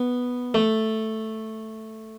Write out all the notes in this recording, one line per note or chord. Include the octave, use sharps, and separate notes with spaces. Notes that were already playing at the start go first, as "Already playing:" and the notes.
Already playing: B3
A3